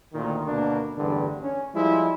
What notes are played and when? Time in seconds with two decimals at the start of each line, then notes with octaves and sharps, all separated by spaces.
0.14 D2 A#2 D#3
0.47 D2 B2 A#3 D4
0.97 A1 E2 G2 D3
1.42 C#4
1.75 F3 G3 G#3 E4